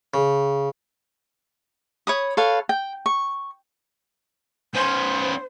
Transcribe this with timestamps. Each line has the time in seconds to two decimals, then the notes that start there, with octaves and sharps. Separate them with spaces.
0.14 C#3
2.07 C#5 B5 D#6
2.37 A4 B4 C#5 F5
2.69 G5
3.06 C#6
4.74 B3 C#4 C5